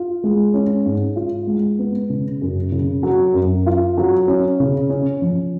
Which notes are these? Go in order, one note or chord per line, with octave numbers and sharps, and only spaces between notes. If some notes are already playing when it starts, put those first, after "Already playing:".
Already playing: F4
G#3
C#4
G#2
F4
G#3
B3
C#3
F#2
C#3
F#3
F#2
F4
F#3
C#4
C#3
C#4
F3